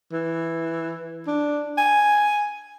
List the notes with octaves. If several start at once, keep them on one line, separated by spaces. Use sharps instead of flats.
E3
D4
G#5